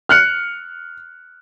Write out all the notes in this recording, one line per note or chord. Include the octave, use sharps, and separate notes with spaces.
F6 F#6 C#7